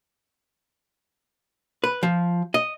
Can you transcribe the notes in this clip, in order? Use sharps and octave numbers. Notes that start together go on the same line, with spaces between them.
B4
F3
D#5